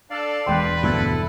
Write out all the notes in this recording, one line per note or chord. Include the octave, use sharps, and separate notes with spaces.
D4 A4 D5 F5
E1 D4 B4 G5 C6
D2 G2 B2 E4 A4